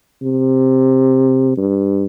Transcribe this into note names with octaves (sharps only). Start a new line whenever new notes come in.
C3
G2